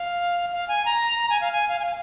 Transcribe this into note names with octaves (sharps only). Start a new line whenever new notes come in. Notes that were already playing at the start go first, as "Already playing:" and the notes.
Already playing: F5
F5
G#5
A#5
A#5
G#5
F5
G#5
F5
G#5
F5